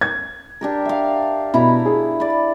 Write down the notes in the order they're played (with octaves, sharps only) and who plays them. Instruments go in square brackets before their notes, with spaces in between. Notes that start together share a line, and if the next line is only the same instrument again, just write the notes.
[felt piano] G#6
[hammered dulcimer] D4 G4 A#4
E5 F5
[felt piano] B2 [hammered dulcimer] E4 A#5 B5
[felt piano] G#4
[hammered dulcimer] D5 B5